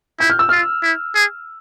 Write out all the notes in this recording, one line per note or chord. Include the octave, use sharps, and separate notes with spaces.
E4 G6
F6
E6
F4 F6
E4
G#4